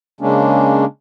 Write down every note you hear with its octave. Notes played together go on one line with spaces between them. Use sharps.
C#3 G#3 A#3 C#4 D4